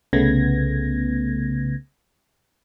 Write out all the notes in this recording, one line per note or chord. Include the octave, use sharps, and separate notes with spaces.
C2 C#3 A3 B3 G#6 A#6